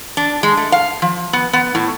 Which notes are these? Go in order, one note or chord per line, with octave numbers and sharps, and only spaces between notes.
D4
G#3
A3
F5
F3
B3
B3
A2